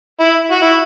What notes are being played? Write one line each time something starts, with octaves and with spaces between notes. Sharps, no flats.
E4
F#4
E4